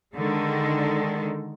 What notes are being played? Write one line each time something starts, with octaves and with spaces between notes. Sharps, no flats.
D3 D#3 G#3 A4